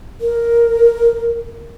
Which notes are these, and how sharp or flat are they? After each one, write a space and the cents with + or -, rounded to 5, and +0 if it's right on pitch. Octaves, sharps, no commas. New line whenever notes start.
A#4 +5